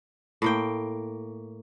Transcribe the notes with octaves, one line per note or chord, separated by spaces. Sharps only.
A2 A#3 G5